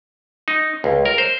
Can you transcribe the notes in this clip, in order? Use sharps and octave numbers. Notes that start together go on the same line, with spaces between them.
D#4
C#2
A#4
C5